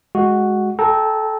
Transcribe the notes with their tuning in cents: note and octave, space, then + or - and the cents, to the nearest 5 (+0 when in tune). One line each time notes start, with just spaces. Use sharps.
G#3 +0 F#4 +0
A4 -20 G5 +0 A#5 -5